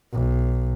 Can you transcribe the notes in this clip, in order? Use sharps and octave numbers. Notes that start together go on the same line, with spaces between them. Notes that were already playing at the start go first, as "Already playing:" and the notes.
B1